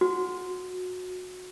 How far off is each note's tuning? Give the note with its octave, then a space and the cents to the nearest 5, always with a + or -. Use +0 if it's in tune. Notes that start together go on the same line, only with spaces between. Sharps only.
F#4 -20